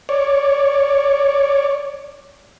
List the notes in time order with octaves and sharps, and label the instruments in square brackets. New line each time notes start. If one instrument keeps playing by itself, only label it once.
[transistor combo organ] C#5 D5